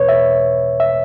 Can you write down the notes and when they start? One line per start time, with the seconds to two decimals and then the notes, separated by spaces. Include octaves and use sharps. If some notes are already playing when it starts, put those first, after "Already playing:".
Already playing: E2 B2 B4 C#5
0.09 E5
0.80 E5